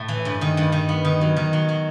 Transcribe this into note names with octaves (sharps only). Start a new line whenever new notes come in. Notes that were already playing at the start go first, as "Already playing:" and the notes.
Already playing: A2 A3
E3
G2
D#3
G2
D#3
B3
D#3
F#3
D#3
F#3
F#3